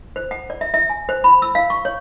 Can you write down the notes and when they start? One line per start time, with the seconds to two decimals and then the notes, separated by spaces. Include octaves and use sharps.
0.16 C5
0.31 F#5
0.50 D5
0.61 E5
0.74 E5
0.90 G#5
1.09 C5
1.24 B5
1.42 E6
1.55 F5
1.70 C#6
1.85 C#5